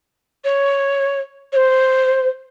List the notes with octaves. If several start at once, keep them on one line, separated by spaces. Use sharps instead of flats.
C#5
C#5
C5